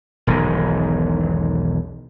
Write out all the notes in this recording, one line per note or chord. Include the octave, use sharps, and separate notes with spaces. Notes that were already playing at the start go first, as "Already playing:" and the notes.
E1 B1 G#2 D#3